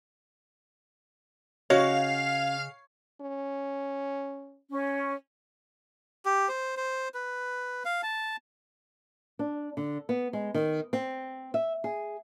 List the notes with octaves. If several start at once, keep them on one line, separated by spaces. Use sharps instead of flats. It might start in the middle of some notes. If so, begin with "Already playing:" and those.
C#3 C#4 F#4 C#5 D#5 F5
C#4
C#4
G4
C5
C5
B4
F5
A5
D4
D3
B3
G#3
D#3
C4
E5
G#4